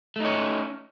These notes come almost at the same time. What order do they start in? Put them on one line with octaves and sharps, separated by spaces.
A3 D#4 C#5 C#4